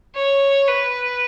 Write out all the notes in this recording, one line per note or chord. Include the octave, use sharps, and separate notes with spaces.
C#5
B4